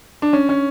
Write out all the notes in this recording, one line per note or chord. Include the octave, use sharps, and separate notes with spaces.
D4
C#4
C#4